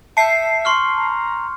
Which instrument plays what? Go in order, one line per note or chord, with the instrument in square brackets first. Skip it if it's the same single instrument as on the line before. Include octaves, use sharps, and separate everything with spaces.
[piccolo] E5 [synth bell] A5 C7 [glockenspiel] G6 C#7
[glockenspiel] C6 C#6 F6
[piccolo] A#5